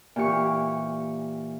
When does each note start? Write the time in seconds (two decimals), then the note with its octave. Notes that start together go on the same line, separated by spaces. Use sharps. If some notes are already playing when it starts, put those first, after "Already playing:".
0.16 A#2 E3 G4 C#6